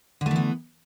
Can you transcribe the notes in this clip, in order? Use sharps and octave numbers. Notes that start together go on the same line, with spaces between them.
D3 E3 A3 B3